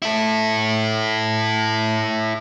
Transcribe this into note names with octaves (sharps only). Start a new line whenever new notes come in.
E4 A4